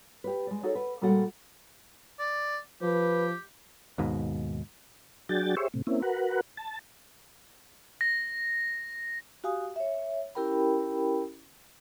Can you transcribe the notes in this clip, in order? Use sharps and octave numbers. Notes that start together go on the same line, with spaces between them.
G4 B4
G#3 D5
D#4 F#4 G#4 A4 C#5
B4
A#2 G3 G#3 F#4 A4 F#5
D5
F3 G4 B4
D#2 G#2 B2
F#3 D4 F#4 G#4 G5 A6
G4 G#4 C5 C#5 E5
A2 C3
A#3 C4 C#4 E4
F#4 A#4 B4 F#5
A5
A#6
F#4 G4 F5 G#5 D#6
C#5 E5
C#4 E4 G4 A#4 G5 B5